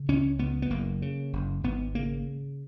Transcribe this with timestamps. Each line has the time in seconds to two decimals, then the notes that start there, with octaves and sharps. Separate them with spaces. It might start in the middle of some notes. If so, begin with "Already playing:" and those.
Already playing: C#3
0.08 C#2 C#4
0.39 C#2 B3
0.62 B3
0.70 F#1 A#3
1.02 C#3
1.33 F#1
1.63 G#1 B3
1.95 C#3 A#3